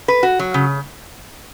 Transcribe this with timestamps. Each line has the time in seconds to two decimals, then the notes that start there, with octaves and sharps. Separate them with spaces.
0.08 B4
0.23 F#4
0.39 F#3
0.54 C#3